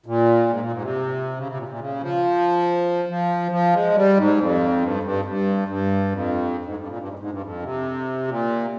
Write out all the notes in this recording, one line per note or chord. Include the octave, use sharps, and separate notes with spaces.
A#2
G#2
A#2
G#2
C3
C#3
C3
A#2
A#2
C#3
F3
F3
F3
G#3
G3
G#2
F2
G2
G2
G2
G2
F2
G#2
G2
A#2
G2
G#2
G#2
G2
F2
C3
A#2